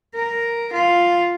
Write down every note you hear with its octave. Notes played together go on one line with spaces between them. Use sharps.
A#4
F4